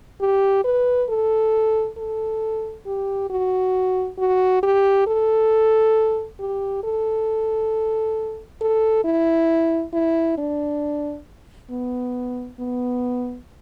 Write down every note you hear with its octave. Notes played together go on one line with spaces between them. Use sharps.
G4
B4
A4
A4
G4
F#4
F#4
G4
A4
G4
A4
A4
E4
E4
D4
B3
B3